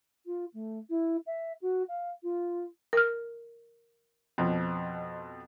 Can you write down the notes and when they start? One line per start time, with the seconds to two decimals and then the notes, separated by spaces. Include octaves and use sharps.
0.26 F4
0.54 A3
0.90 E4
1.26 E5
1.62 F#4
1.89 F5
2.23 F4
2.93 A#4 F6
4.38 F2 B2 F3